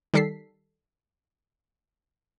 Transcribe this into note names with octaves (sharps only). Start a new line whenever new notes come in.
D#3 G3 A4 B6 C7